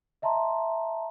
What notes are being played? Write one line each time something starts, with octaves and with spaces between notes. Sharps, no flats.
D#5 E5 A5 A#5 C6